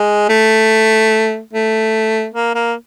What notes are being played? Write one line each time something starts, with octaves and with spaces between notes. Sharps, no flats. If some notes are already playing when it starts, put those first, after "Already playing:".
Already playing: G#3
A3
A3
A#3
A#3